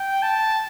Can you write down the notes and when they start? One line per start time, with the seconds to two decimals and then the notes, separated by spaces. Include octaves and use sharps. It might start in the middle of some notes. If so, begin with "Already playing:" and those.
Already playing: G5
0.23 A5